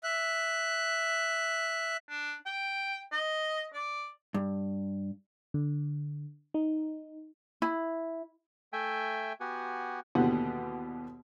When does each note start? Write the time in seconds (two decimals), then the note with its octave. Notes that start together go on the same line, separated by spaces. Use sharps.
0.04 E5 F#6
2.09 D4
2.46 G5
3.12 D#5
3.74 D5
4.34 G2
5.54 D3
6.54 D#4
7.62 E4
8.73 A3 E5 G5 G#5
9.40 B3 F#4 G4 F#5 G#5
10.15 D#2 B2 D3 E3 G4 F#5